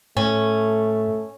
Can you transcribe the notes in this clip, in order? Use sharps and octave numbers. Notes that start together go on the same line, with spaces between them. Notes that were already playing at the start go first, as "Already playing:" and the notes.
A2 A3 C#4